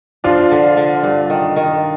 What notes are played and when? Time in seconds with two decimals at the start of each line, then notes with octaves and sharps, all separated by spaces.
0.24 F3 D4 F4
0.51 D3
0.77 D3
1.03 G2
1.30 D#3
1.56 D#3